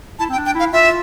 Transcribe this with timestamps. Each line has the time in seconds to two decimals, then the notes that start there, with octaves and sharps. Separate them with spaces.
0.19 E4 A5
0.29 C4 G5
0.37 D4
0.46 G5
0.55 E4 F5
0.73 F4 E5